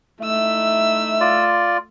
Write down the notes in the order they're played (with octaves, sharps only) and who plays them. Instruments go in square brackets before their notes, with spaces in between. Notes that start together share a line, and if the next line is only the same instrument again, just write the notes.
[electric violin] A3 E6 [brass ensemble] D#4 E4 E5
[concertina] F4 D5